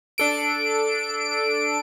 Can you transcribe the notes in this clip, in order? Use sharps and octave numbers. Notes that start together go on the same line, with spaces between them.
D4 A4 D7